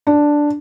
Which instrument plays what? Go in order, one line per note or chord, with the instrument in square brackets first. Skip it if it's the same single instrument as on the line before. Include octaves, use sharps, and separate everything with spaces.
[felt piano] D4